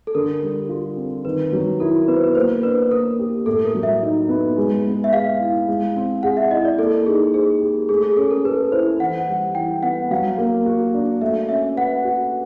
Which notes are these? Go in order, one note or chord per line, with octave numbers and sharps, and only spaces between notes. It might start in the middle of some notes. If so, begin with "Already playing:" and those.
A4
D3 A#4
G3
F4
C4
D#3 B4
F#3
E4 A#4
B3 B4
C5
B4
A#3 C5
D4 B4
A#3 A#4
G4
A2 A4
A#4
F#3
E5
D#4
B3
G#3
B3
E5
G#4 F5
E4
G#3
C4
G#4 F#5
E5
E4 D#5
D5
A#3 A4
D#4 G#4
G#4 C5
G4
A3 G#4
G#4
C#4 A4
A#4
A4 B4
E4 C5
E3 F#5
G3
E3 G5
B3 F#5
F#3 F5
A#3
F#4
D4
A3 E5
C#4 E5
B4 F#5
F#4